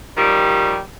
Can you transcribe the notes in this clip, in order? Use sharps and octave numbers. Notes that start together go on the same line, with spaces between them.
D#3 F3 G3